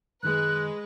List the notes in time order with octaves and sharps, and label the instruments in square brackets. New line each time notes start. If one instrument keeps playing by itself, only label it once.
[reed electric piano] F#2 D#3 [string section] G#3 B4 [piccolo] F#6